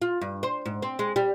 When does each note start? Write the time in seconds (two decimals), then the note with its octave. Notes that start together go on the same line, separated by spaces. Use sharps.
0.02 F4
0.21 G2
0.43 C5
0.66 G#2
0.82 C4
0.99 G#3
1.16 G3